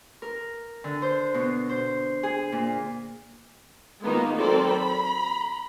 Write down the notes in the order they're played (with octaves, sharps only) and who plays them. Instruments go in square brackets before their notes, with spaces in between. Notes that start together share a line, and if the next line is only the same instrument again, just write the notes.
[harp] A#4
D3
C5
B2
C5
G#4
A#2
[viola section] D#3 G#3 A#3 B3 D#4 F4
F#3 C4 A4 A#4 D5
B5